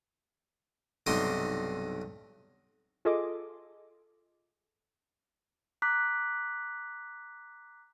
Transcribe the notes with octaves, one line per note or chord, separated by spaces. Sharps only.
B1 G2 C3 C4 D#4 C6
F4 G#4 A4 D#5 C6 D6
A#5 D6 F#6 B6